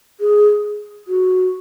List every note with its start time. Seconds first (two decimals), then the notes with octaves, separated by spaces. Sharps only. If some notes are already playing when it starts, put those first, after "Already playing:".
0.20 G#4
1.08 F#4